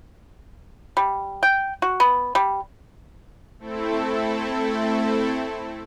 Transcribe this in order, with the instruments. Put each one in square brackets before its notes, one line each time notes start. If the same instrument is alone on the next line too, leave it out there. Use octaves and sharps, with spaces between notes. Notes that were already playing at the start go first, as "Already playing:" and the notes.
[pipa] G3
G5
F#4
B3
G3
[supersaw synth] A3 C4 E4 A4